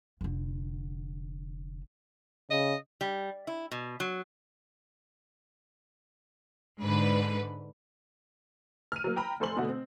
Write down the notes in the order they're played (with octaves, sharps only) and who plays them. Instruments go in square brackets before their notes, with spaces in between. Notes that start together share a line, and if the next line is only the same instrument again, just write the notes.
[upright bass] F1 D3
[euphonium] C#3 [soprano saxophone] D#5
[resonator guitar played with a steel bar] G3
E4
B2
F#3
[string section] G#2 D3 B4
[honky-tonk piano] F6 D#7
F#3 A#3
G5 A#5 B5
F1 A4 C5 G#5 C6 F#7
B2 D3 A3 F#4
C4